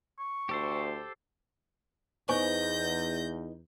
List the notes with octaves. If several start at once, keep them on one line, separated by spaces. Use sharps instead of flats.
C#6
D2 G4 A4 C5
E2 B3 D#4 C5 G#5 C#6 G6 A#6